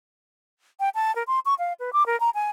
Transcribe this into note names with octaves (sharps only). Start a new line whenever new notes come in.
G5
A5
A#4
C6
C#6
F5
B4
D6
A#4
A#5
G#5